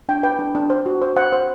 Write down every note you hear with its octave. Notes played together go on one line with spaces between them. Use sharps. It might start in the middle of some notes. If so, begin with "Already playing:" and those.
D4 G5
B4 G5
D4
D4
C5
F#4
C5
C5 F#5
C5